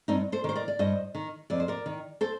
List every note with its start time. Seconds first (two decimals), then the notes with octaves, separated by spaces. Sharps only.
0.08 G2 C4 D#4
0.32 A4 C5
0.44 D#3 C5
0.56 A#4 D5
0.68 D5
0.79 G2 C5 D#5
1.15 D#3
1.50 F2 D5
1.60 C5
1.68 A#4 D5
1.86 D#3
2.21 A4 C5